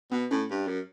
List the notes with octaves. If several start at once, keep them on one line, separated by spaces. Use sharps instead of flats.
B2 B3
A2 C#4
G2
F#2